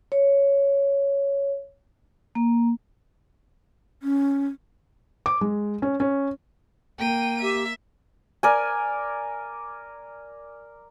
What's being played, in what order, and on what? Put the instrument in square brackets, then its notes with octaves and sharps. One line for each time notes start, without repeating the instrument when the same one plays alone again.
[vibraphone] C#5
A#3
[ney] C#4
[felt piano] D6
G#3
C#4
C#4
[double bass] A#3 [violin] G5 D#7
[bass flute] G4 [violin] E5
[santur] A#4 D5 G#5